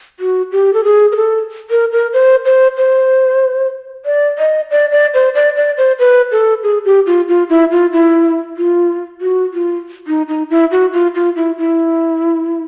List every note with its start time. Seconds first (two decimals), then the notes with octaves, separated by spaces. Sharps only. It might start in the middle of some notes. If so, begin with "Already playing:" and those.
0.20 F#4
0.52 G4
0.74 A4
0.84 G#4
1.12 A#4
1.16 A4
1.70 A#4
1.92 A#4
2.13 C5
2.45 C5
2.78 C5
4.06 D5
4.38 D#5
4.71 D5
4.92 D5
5.14 C5
5.35 D5
5.56 D5
5.77 C5
5.99 B4
6.32 A4
6.63 G#4
6.85 G4
7.07 F4
7.28 F4
7.50 E4
7.72 F4
7.93 E4
8.57 F4
9.21 F#4
9.54 F4
10.07 D#4
10.28 D#4
10.50 E4
10.71 F#4
10.93 F4
11.15 F4
11.36 E4
11.58 E4